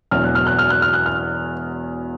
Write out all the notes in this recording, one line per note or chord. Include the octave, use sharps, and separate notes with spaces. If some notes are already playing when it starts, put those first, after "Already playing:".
E1 E2 B2 F#3 F6
F#6
F6
F#6
F6
F#6
F6
F#6
F6